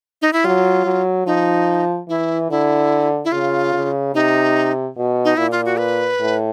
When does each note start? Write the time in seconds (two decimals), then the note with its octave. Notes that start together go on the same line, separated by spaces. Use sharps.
0.22 D#4
0.33 E4
0.44 F#3 F4
0.85 F#3
1.27 F3 D#4
2.09 E3 E4
2.50 D3 E4
3.25 E4
3.32 C#3 F4
3.74 C#3
4.14 C3 D#4
4.97 B2
5.25 D#4
5.37 A#2 E4
5.52 F4
5.66 F#4
5.78 B4
6.20 A2